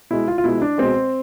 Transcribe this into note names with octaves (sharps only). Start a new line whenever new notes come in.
B2 G#3 E4
F4
F4
B2 G#3 E4
D4
B2 G#3 C4